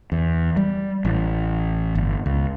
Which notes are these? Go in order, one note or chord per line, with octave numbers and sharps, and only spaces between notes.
E2
G3
A1
G1
C#2